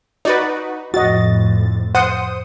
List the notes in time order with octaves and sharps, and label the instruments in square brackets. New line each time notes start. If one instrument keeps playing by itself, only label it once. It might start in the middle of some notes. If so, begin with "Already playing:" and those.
[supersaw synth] D#4 F#4 B4 [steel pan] D5
[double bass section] F2 A2 [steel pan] F#4 D#5 [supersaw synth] A6
[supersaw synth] C5 D#6 [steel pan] F#5